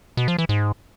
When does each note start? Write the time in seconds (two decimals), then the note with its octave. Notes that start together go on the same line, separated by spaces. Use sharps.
0.17 B2
0.28 F3
0.39 E3
0.49 G#2